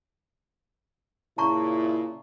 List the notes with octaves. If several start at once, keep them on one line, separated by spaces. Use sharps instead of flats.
A#2 C#3 E4 A5 A#5 C#6